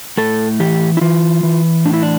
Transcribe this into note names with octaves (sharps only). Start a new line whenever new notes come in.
A2 A4
E3 G4
E4
E3 F4
E3
A2 D4
E4
D4